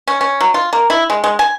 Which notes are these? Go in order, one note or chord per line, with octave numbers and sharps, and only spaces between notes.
C#4
C#4
F#3
F4
A#3
E4
G#3
G#3
G#5